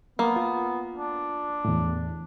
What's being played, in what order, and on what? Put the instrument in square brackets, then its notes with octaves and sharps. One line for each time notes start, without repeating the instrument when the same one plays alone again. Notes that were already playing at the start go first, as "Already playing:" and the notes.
[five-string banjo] A#3 [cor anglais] B3
[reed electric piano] F4
[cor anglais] D4
[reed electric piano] E2 A2